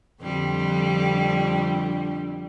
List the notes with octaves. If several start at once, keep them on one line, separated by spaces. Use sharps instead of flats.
F2 D3 G3